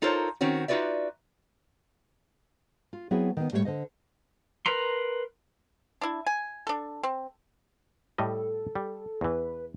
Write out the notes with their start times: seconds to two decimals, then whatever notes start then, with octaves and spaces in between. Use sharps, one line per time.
0.02 D#4 F4 A4 A#4 C5 C#5
0.41 D#3 C4 C#4 F#4
0.68 D#4 F4 F#4 B4 D5 E5
2.93 F4
3.11 F#3 B3 C4 E4 F#4 G#4
3.37 D#3 B3
3.52 A2 G3 A3 B3 C#5
3.65 D3 C5 D#5
4.66 A#4 B4 A#5 C6
6.01 D4 E4
6.26 G#5
6.67 D4 A4
7.03 C4
8.18 A2 G3 A4 D#5
8.75 G3
9.21 E2 E3 B4